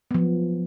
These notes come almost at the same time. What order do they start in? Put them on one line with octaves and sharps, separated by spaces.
B3 F3 F#3